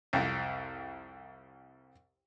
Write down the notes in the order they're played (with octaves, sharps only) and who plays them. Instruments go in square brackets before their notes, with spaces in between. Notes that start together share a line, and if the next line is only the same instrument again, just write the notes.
[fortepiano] C2 F2